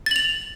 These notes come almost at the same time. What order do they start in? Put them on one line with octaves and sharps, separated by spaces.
A6 F#7 F7